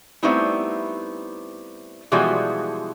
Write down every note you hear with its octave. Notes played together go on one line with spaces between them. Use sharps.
G3 A3 B3 C4 D#4 E4
B2 E3 F3 G3 G#3 F#4